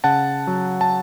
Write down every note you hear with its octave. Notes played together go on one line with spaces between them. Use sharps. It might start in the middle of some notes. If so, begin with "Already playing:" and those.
C#3 F#5 A5
F#3
A5